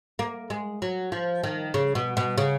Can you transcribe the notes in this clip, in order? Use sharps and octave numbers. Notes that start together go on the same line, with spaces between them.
A#3
G#3
F#3
F3
D#3
C#3
B2
B2
C#3